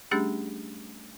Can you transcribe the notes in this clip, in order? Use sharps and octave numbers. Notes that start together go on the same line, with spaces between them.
G3 A3 C#4 D4 G4 G#4